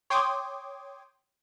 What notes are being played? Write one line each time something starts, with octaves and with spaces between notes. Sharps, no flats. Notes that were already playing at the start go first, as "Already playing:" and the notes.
C#5 G5 C6 D6 D#6 G#6